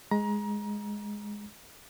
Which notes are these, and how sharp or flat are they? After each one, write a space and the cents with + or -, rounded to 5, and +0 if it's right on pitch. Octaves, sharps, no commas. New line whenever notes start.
G#3 +0 A#5 +25